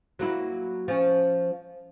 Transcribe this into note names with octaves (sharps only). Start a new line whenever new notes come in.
F#3 A#3 E4
F3 C#4